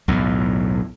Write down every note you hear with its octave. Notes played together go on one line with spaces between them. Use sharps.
B1 E2 A2